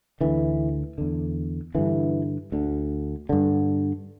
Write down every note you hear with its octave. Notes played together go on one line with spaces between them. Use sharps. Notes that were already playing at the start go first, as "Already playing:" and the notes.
D2 D3 E3
E2 D3
G2 D3 E3
D2 D3
G2 D3